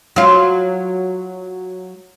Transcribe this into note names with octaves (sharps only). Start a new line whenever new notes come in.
F#3 F4